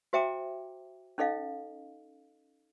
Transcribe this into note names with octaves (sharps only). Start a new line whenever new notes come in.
F#4 C5 E5 G5 A#5 D6
C#4 D#4 A4 D#5 F5